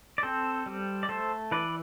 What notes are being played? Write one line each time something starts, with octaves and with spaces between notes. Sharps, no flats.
D5
C4 A4 C5
G3
D5
A3 A4 C5
E3 B4 D5